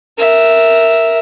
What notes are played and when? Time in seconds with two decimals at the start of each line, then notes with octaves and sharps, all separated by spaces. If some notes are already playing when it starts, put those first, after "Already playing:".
0.19 A#4 E5